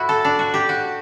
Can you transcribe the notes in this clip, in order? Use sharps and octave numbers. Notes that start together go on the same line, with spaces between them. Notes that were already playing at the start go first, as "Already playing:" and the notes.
Already playing: A2 E4 F#4
A4
D4
F#4
G4
F#4